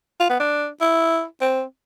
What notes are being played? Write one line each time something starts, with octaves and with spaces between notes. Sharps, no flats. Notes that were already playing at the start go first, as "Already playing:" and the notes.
F4
B3
D4
E4
C4